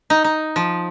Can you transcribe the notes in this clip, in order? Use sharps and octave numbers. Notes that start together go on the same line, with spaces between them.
D#4
D#4
F3